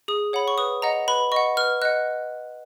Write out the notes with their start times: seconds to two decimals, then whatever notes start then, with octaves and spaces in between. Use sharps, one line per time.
0.08 G#4 D#6
0.33 C#5 F#5 B5
0.48 C#6
0.58 B4 D#6
0.82 D#5 F#5 A#5
1.08 B4 B5
1.32 D#5 F#5 C#6
1.57 B4 F6
1.82 D#5 F#5 F#6